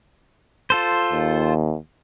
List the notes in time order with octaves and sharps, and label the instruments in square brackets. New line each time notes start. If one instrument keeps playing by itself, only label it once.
[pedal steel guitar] F4 A4 C5
[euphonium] D#2